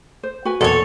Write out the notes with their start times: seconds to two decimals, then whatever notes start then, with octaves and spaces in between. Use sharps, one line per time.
0.23 C5
0.45 F#4 B4 G#5
0.61 B1 E2 A#2 A4 C#5